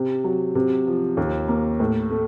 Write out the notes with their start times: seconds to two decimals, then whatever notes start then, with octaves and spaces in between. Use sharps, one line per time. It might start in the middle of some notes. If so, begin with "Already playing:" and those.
Already playing: C3
0.24 F#3
0.55 C3
0.87 F3
1.17 D#2
1.48 A#3
1.80 A2
2.10 A3